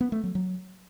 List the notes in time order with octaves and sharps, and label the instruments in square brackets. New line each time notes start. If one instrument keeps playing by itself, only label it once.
[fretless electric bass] B3
A3
F#3
F#3